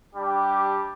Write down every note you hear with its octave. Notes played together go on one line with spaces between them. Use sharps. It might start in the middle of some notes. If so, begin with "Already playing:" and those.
G3 D4 G4